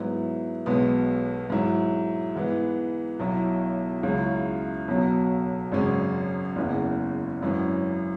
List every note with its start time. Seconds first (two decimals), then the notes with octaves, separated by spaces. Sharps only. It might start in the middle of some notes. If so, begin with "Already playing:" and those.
Already playing: G#2 F#3 B3 E4
0.66 B1 B2 G#3 B3
1.50 G#2 F#3 E4
2.35 G#2 E3 B3
3.19 B1 B2 F#3 E4
4.03 C#2 C#3 F#3 C#4 E4
4.88 B1 B2 F#3
5.72 G#1 F#2 C#3 G#3 C#4
6.56 F#1 E2 C#3 E3
7.41 G#1 F#2 E3 C#4